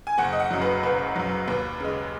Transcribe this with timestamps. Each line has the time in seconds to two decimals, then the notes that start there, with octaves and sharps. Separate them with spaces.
0.07 G#5
0.18 F#1 F#5
0.33 D#5
0.40 F#5
0.51 F#2 F#3
0.61 B4
0.83 F#1 B4
1.16 F#2 F#3
1.48 D#2 B4
1.80 C#3 G#3